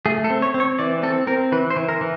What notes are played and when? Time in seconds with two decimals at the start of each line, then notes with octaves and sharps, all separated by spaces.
0.06 A3 G#4
0.24 A4
0.30 C4
0.42 C#5
0.54 C4
0.60 C#5
0.79 E3 D5
1.03 C4 A4
1.27 C4 A#4
1.52 E3 B4
1.70 C5
1.76 E3
1.89 A#4
2.01 E3